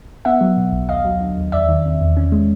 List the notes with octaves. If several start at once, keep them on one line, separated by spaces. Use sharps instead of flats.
B3 E5 F#5
F#3
B2
B1
D#2 D#5 F5
F#3
D3
D#2
E2 D5 E5
D#3
C3
E2
C#4
G#3